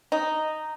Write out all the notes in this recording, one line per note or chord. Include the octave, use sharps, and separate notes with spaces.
D#4